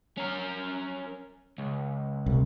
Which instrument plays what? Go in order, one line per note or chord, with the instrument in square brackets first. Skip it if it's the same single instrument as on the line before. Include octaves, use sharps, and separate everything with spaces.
[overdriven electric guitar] C#4 A#4
C#2
[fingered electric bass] C2